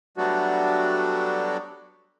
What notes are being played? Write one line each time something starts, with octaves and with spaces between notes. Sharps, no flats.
F#3 G3 A3 B3 D4 F#4